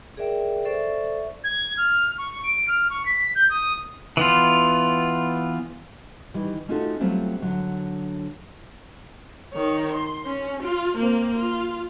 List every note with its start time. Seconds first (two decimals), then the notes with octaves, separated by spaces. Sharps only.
0.17 G#4 A#4 D5 E5 G5
0.65 A4 C5 D5 E5 C#6
1.44 G#6
1.77 F6
2.18 C#6
2.44 D7
2.68 F6
2.90 C#6
3.06 B6
3.35 G6
3.50 D#6
4.17 E3 B3 F4
6.34 D#3 E3 G3
6.68 A3 C#4 D#4 F4 F#4 A4
7.00 F#3 G3 A3 C4 C#4 F4
7.42 D3 F#3
9.53 D#3 C#5
9.93 C6
10.26 C#4
10.63 F4
10.98 A#3 C4
11.36 F4